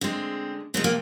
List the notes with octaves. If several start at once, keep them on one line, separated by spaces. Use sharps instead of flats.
D3 G#3 C4
C3 F3 G#3 C4
A#3